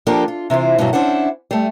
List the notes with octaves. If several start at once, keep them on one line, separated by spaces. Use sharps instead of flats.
F3 A#3 D4 G4 A4 A#4
F4
C3 E3 F4 C5
G2 B2 E3 F#3
C#4 D4 E4 C5 F#5
G3 A3